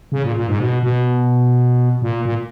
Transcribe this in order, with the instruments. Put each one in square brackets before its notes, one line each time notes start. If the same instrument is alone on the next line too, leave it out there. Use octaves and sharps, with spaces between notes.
[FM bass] C#3
A#2
A#2
G#2
B2
B2
A#2
A#2